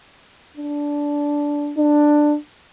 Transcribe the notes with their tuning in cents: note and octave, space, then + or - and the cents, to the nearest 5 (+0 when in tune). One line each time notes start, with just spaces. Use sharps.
D4 -10
D4 +10